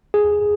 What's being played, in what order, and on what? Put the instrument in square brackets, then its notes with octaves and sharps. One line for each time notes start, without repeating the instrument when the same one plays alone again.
[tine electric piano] G#4